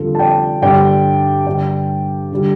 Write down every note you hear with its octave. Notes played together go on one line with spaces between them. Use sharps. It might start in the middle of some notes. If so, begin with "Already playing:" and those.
Already playing: F2 D3 G3 F4 A4
A5
D5 G5
G2 D3 G3 D5 G5
G2 D3 G3 D5 G5
D3 G3